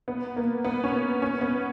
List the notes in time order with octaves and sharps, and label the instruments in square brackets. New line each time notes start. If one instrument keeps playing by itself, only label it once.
[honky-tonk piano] B3
A#3
B3
C#4
C#4
B3